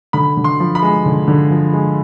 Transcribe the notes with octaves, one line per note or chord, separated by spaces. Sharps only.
D3 B5
D3
C6
F3
B5
G#3
D3
D3
F3
G#3